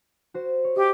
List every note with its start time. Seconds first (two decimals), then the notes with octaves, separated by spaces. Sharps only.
0.34 F#4 C5
0.64 C#5
0.76 G4 D#5